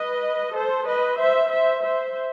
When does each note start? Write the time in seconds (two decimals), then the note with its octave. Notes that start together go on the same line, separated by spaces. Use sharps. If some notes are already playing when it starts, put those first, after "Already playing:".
Already playing: B4 D#5
0.56 A4 C5
0.88 B4 D#5
1.20 C5 E5
1.51 C5 E5
1.83 C5 E5